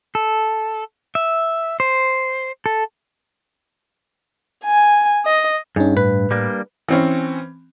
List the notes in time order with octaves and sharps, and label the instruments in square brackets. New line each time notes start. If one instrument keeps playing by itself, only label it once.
[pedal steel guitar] A4
E5
C5
A4
[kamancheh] G#5
D#5
[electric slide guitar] G2 [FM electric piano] C#4 D#4 G#4
[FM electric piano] A2 [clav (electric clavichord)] B4
[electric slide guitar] G3 A#3 D4
[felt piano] E3 C4 C#4